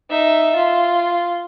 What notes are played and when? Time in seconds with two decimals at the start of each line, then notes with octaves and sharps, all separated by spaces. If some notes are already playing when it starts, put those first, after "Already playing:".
0.10 D#4 E5
0.56 F4